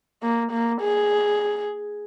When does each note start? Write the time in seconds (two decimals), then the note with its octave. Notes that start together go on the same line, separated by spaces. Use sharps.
0.23 A#3
0.52 A#3
0.81 G#4